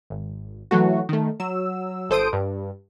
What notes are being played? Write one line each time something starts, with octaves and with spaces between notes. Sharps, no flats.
G#1
E3 F#3 A3 F#4
D#3 A3
F#3 E6
G1 A4 C5 D#6 D7
G2